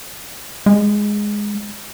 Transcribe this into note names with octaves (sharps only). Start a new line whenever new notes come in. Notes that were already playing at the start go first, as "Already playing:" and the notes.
G#3